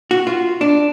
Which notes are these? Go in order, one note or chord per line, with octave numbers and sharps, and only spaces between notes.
F#4
F4
D4